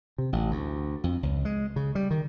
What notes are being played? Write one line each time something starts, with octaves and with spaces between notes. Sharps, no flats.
C3
A1
D2
F2
C#2
G#3
C#3
G3
D#3